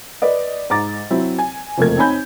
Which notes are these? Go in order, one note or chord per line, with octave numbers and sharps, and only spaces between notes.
B4 D5 D#5
G#2 A#5 D6 A6
F#3 C4 E4
G#5
F#1 F2 A3 A#3 A#4 G#6
C4 D#4 C#5 G#5 B5 G6